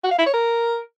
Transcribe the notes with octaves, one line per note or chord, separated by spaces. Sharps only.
F#4
F5
E4
C#5
A#4